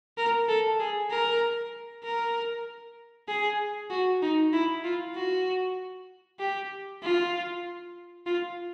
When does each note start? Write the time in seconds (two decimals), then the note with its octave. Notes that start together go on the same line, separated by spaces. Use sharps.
0.18 A#4
0.48 A4
0.80 G#4
1.10 A#4
2.04 A#4
3.28 G#4
3.90 F#4
4.22 D#4
4.53 E4
4.84 F4
5.15 F#4
6.39 G4
7.02 F4
8.26 F4